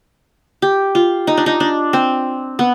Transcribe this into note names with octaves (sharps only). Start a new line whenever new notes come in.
G4
F4
D#4
D4
D#4
D4
C4
B3